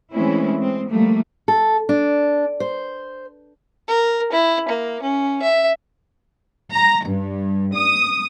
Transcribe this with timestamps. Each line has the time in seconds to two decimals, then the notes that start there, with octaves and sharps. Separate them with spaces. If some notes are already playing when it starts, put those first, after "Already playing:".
0.12 E3 G#3 A3 C4 C#4 E4
0.60 G#3 C4
0.89 F3 G3 A3 A#3
1.48 A4
1.89 D4
2.60 C5
3.88 A#4
4.32 E4
4.68 A#3
5.02 C#4
5.42 E5
6.72 A#5
7.06 G2
7.75 D#6